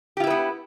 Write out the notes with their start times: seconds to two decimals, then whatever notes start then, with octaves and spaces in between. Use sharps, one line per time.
0.17 G4
0.20 F4
0.24 E4
0.27 B4
0.30 B3